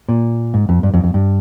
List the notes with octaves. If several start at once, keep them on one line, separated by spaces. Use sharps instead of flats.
A#2
G#2
F2
G2
F2
F2
G2